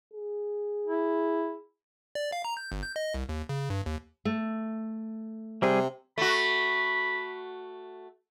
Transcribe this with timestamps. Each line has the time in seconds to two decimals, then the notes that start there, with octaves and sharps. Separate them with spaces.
0.14 G#4
0.87 E4
2.15 D5
2.32 F5
2.45 A#5
2.57 G6
2.72 G1
2.83 G6
2.96 D#5
3.14 C2
3.29 D#2
3.49 C#3
3.70 G2
3.86 D#2
4.25 A3
5.62 C3 G3 C4 G#4
6.18 A3 F#4 B5